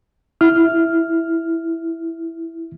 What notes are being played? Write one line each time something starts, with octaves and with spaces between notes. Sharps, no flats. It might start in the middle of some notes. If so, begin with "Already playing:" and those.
E4 F6